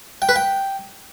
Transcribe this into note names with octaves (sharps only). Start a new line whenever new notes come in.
G5
B4
G5